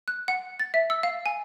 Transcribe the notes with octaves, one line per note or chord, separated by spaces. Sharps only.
F#6
F#5
A6
E5
E6
F5
G#5